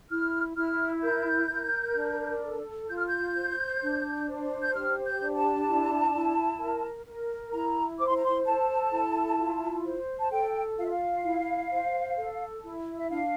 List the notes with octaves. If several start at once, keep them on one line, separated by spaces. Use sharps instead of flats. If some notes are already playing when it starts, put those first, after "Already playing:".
E4 F6
E4 F6
A#4 G6
A#4
D4
A4
F4 G6
F6
G6
C5
D4
C5
G6
G4 F6
G6
D4
A5
E4
E4
A#4
A#4
E4 A#5
C5 D6
C6
A#5
C6
A4 A5
E4
F4
C5
A5
A4 G5
F4 F5
E5
F5
E4
C5
A4
E4
E5
D4 F5